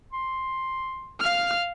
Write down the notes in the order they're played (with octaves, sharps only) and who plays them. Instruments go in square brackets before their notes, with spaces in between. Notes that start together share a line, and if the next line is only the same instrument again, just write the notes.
[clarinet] C6
[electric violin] F5 F6